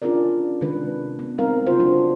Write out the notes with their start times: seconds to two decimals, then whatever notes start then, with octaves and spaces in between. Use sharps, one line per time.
0.02 C#4 D4 F4 G#4 A#4 D5
0.61 C3 D#3 G#3 D4 B4
1.19 B3
1.38 G3 G#3 C4 D#4 A#4 F5
1.66 C#3 F4 F#4 C5
1.80 F#3 D4